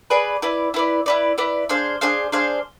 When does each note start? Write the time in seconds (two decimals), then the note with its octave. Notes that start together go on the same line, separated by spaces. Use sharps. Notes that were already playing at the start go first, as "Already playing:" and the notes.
0.10 G#4 B4 D5
0.42 E4 B4 D5
0.74 E4 B4 D5
1.06 E4 B4 D5
1.38 E4 B4 D5
1.69 D4 G#4 C5 F5
2.01 D4 G#4 C5 F5
2.32 D4 G#4 C5 F5